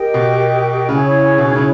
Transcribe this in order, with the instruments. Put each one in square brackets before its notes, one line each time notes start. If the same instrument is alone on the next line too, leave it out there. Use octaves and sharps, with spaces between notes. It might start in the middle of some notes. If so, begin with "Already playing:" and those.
Already playing: [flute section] G4 A#4 D#5 G5
[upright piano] B2
[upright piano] C#3 [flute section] C#4 E4 G#4 C#5
[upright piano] B2
D#3
C#3